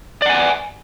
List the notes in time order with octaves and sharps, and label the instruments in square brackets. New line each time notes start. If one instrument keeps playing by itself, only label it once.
[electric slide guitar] D5
F#5
G#5